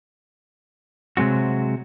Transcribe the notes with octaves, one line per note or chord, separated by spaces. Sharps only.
C3 F#3 G#3 C4 F#4